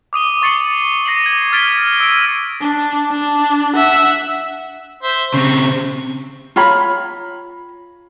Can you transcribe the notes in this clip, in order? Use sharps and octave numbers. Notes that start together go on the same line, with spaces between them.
D6 D#6 D#7 G7
C#6 A6 C7 C#7 F#7 G7
D6 A#6 C7 D#7 F#7
D6 G#6
F6 G#6 A6 B6 D7 G7
E6 D7 D#7
D4
D4
E5 F#5
C5 E5
C#3 C4 C#6
F4 C#5 A#5 B5